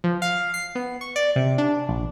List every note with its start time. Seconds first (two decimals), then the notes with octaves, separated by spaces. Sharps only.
0.04 F3
0.22 F5
0.54 C7
0.75 B3
1.01 C#6
1.16 D5
1.36 C3
1.58 D4
1.89 A#1